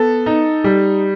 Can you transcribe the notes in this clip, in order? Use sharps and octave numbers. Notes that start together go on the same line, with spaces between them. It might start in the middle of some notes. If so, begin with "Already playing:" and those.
Already playing: B3 A4
D#4
G3